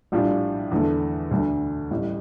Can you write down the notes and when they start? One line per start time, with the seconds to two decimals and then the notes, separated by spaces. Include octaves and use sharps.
0.12 A#1 A2 G3 D4 F4
0.71 E2 D3 A3
1.31 D2 D3 A3 D4
1.91 A1 A2 G3